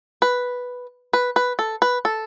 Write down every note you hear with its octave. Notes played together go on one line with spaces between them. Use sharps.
B4
B4
B4
A4
B4
A4